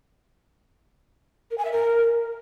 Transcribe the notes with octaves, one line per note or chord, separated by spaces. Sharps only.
A#4
G#5
E5
A#4